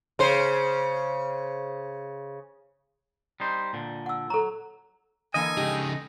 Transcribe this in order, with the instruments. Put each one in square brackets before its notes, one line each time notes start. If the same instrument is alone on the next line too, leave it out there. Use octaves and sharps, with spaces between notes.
[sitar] C#3 C5
[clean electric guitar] G3 D#4 C5
A#2 D3
[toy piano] F#5 E6
[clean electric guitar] F#3 [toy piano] A4 A#5
[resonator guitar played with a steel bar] D3 E3 A#3 [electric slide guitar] A4 D#5 [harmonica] G#5
[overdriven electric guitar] C#3 D#4 [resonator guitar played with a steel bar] G#3 G4